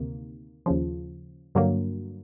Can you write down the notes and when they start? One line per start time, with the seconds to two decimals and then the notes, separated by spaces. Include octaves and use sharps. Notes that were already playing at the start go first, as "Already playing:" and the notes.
Already playing: D2 C3 D#3 A#3
0.66 D#2 C#3 F3
1.55 G2 D3 F#3 A#3